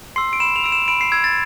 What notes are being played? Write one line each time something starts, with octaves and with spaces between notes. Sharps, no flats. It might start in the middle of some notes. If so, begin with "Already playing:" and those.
C6 E6 C7
D7
B5 E7
F7
E6 D7
E7
B5 D7
C7
E6 G#6
A6